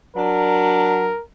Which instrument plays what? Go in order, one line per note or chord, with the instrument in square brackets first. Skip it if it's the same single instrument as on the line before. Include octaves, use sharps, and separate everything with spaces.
[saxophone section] F#3 D4 [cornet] A#4